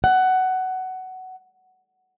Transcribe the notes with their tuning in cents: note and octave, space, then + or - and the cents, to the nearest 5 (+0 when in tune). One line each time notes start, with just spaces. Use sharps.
F#5 +15